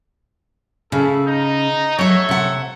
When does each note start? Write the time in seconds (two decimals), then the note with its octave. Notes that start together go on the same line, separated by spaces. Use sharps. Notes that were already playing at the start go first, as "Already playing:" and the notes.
0.92 C#3 E4 A4
1.26 D#4
1.99 F#3 A4 C#5 E5
2.29 C3 F#5